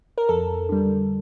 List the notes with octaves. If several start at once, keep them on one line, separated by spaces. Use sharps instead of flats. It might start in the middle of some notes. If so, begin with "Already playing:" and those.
A#4
F2 A4
D3 G3